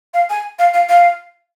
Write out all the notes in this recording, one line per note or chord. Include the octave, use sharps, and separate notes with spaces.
F5
G#5
F5
F5
F5